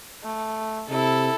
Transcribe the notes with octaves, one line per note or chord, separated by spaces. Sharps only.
A3
C3 E4 A4